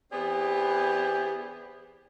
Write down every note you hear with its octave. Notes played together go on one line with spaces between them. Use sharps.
E3 B3 C4 D4 G4 G#4